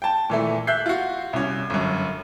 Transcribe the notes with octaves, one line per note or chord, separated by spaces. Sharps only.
G5 A5
A#2 E3 A3
E5 F#6 G6 C7
F4 F#4
C2 C#4
G1 F#2